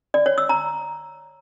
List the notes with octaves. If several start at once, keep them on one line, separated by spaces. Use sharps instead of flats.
D5
C#5
E6
A#5